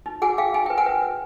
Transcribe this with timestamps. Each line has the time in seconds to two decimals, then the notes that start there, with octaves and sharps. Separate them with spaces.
0.06 D#4
0.22 G#4 F#5 G#5
0.38 G#4 F5 G5
0.54 D#4 G#5
0.66 B4 G5
0.78 F#5 G#5
0.86 B4
1.02 B4